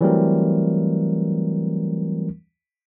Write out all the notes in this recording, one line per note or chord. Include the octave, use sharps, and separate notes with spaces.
E3 F#3 G3 A3 C4 A#4